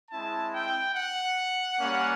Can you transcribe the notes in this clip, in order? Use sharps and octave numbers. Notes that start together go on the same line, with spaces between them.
G#3 C4 E4 A5
G5
F#5
G3 A#3 C#4